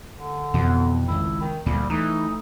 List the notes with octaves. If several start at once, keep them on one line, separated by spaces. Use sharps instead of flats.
D3
F2 B2 E3 B3
G#1 C#2 E4
D#3
D2 A#2 G3
E3 A3 D#4